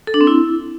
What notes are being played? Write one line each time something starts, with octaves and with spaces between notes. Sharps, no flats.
A4
D4
C4
E4